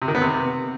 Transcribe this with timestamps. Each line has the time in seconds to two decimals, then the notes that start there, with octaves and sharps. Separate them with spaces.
0.02 C3
0.08 D#3
0.15 B3
0.21 C3